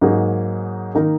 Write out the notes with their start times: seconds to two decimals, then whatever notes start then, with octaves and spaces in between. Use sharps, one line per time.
0.01 G#2 F#3 A#3 D#4 G#4
0.95 D#3 A#3 D#4 A#4